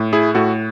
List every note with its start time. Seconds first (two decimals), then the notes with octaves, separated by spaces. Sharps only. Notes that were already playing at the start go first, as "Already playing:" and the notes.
Already playing: A2
0.13 E4 G#4
0.34 A2 F#4 A4